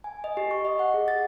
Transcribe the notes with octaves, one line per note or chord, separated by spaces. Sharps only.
G#5
D#5
G4
C#6
D#5
F#5
G#4
A6